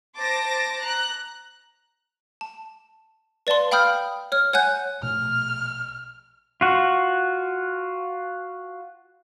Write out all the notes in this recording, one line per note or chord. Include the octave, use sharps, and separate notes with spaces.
C5 A5 D6 A6 A#6
A#5 F#6
A5
B4 D5 F5 A5 C6
F5 G5 B5 D#6 F6 G6
C#5 F6
C#5 F#5 G#5 F#6 G6
A#1 B2 A3 F6
F4 F#4